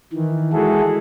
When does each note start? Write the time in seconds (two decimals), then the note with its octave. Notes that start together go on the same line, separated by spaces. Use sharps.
0.13 D#3 E3
0.53 G#3 E4 F#4 G#4 A4